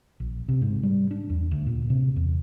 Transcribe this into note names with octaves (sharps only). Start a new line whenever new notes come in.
A#1
C3
G#2
G3
D4
E2
D2
A#2
C3
E2